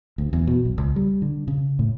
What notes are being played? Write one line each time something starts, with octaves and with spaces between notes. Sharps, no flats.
D2
E2
B2
B1
C#2
G3
D3
C#3
A2